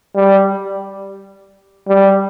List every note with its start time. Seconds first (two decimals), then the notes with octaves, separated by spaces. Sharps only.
0.16 G3
1.88 G3